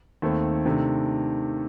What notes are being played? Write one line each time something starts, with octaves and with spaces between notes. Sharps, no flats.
D#2 D#3 A3 C4
C3 D#3 A3 D4